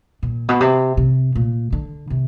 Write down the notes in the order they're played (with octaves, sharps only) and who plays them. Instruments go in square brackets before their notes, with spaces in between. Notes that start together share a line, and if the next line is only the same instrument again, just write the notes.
[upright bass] A#2
B2
C3
C3
A#2
D3
C3